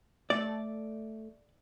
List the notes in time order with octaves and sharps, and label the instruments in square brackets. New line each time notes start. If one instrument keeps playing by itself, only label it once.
[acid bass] A3 [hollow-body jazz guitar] D5